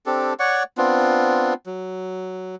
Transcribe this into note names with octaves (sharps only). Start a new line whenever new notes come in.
C4 D4 G4 A4
C#5 D5 F#5 C#6
B3 C4 D4 F4
F#3